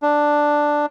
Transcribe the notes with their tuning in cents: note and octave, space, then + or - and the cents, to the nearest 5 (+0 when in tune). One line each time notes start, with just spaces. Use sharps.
D4 +5